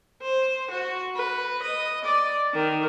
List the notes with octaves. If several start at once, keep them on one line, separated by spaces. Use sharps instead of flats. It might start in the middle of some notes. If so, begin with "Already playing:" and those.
C5
F#4
B4
D#5
D5
D#3